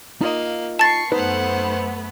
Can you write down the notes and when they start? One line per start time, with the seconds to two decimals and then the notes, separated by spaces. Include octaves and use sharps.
0.21 A#3 D#4 F4 D#5
0.79 A5 C#6 A6 C7
1.12 F#2 A3 B3 D#4 B4 C5 F#5